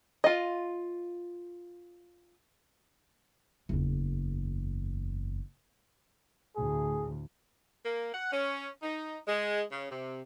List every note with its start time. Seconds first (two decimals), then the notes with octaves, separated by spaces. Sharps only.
0.24 F4 D#5
3.69 F#1 E2
6.56 D2 A2 G#4
7.85 A#3
8.14 F#5
8.31 C#4
8.83 D#4
9.26 G#3
9.72 C#3
9.90 C3